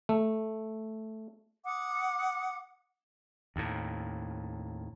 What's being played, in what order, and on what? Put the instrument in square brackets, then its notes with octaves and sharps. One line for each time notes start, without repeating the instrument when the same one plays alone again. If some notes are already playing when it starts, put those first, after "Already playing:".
[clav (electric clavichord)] A3
[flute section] F#5 D6 D#6
[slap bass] D#2 A2